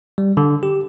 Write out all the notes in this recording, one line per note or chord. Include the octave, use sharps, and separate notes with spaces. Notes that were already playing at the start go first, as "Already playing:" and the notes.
G3
D3
G4